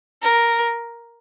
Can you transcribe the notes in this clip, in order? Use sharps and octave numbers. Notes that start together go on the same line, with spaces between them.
A#4